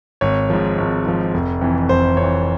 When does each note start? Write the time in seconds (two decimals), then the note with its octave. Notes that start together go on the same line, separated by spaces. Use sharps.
0.21 G#1 C#5
0.50 G#2 F3
0.78 G#1
1.05 G#2 F3
1.34 F1
1.61 F2 E3
1.89 F1 C5
2.17 F2 C#5
2.22 E3